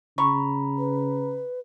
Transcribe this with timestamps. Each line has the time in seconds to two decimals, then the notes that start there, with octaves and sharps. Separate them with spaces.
0.18 C#3 A#5 B5 C#6
0.78 B4